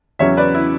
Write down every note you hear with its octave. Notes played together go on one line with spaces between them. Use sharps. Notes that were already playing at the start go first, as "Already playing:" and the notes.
E2 C#3 F#3 C#4 C#5 E5
B4 D5
E4